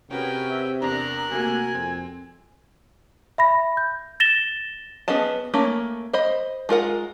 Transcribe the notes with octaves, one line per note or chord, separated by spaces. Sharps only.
C3 C#4 F#4 G#4 A#4 B4 G5
E5
E2 D4 A#4 A#5 F#6
C3 A3 A#3 F#4 G#5
F2 C4
E5 B5 A#6
G6
A6 A#6 E7 G7
B3 C#4 G#4 D#5 A5
A3 A#3 C#4
C5 D#5 B5
G#3 F4 A#4 F#5